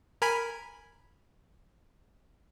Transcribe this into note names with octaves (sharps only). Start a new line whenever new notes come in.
A#4 G#5 B5